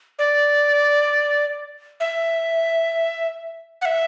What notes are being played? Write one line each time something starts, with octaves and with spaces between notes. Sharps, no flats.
D5
E5
F#5
E5